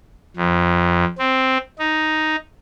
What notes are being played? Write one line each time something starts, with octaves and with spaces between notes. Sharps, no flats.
F2
C4
D#4